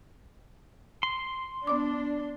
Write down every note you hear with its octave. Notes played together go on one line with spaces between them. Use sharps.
C6
B3 D4 D5 D6